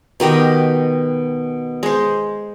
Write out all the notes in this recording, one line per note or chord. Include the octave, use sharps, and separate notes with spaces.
B2 D#3 G4 D#5
G#3 C5